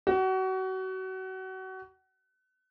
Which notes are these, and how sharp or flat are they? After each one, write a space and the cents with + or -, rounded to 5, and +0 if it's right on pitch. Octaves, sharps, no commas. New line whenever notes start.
F#4 +30